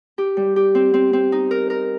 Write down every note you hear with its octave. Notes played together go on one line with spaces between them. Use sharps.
G4
G3
G4
C4
C4
C4
D#4
A#4
A#4